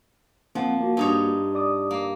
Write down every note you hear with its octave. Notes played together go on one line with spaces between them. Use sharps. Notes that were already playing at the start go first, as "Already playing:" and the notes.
F3 A#3 C4 F#5
A#3 F#4
G2 D#4 C#5
D5 D6 D#6
A#3